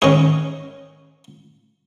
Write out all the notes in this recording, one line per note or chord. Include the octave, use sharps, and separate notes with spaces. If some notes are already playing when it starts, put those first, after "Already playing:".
G#2 D#3 C#4 G#4